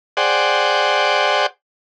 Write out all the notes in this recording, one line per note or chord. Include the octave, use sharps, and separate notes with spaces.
G#4 C5 D5 F#5 G5